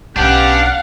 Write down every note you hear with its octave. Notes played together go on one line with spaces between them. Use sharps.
B1 B3 C#4 D4 G4 F5 F#5